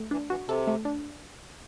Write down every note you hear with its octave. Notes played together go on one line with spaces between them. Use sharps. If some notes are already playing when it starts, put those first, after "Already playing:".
Already playing: A3
E3 D4
E3 F#4
C3 A4
A3
D4